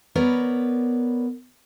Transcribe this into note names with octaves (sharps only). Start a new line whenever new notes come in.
B3 A#4 B4 C#5 D5